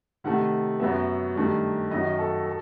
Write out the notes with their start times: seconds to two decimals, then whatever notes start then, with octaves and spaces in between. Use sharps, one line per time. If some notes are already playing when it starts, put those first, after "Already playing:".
0.24 C3 D#3 A3 F#5
0.80 F#2 F#3 B3 E5
1.35 G2 D#3 A3
1.91 F#2 D#3 F#3 D#5
2.19 A4
2.46 A4